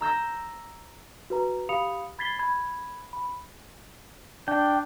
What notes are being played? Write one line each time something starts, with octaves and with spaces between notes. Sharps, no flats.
A#5 E6 G6 A#6
F#4 B4 A#5
G4 F5 B5 D#6 C#7 F7
B5 G#6 A6 B6 C7 G7
B5 G#6
B5
D4 G5